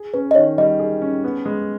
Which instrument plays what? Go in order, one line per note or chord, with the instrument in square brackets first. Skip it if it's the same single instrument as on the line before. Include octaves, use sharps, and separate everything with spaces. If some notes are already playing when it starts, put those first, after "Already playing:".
Already playing: [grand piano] G#4
[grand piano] C#4 [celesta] B4
[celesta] D#5
[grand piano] D#3 [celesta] C#5
[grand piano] G3 [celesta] D#5
[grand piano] G#4
C#4
B3
G#3